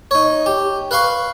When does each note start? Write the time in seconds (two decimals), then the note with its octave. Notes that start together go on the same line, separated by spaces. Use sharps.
0.11 D#4 C#5
0.46 G4
0.91 B4 F5 C6 C#6